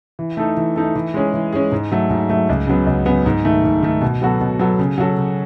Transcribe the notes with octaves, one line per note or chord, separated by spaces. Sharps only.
E3
A3 D#4 A4
E3
A3 D#4 A4
E3
G#3 C#4 G#4
E3
G#3 C#4 G#4
G#2
F#3 A3
G#2
F#3 A3
C#2
C#3 F#3 B3
C#2
C#3 F#3 B3
G#2
D#3 A3
G#2
D#3 A3
B2
F#3 B3 F#4 A4
B2
F#3 B3 F#4 A4
C#3
F#3 C#4 F#4 A4
C#3